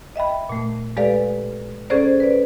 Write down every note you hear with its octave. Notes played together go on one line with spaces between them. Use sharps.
D#5 E5 G5 B5
A#2 A3
G#3 G4 A4 B4 D5 F5
C#4 G#4 A4 C5 D5
B4 D5